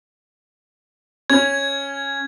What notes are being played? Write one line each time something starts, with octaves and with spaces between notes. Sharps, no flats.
C#4 G#6